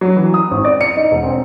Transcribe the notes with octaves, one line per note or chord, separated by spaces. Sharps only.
F#3
E3
D#6
G#1
D5
C#7
D#4
E1
C4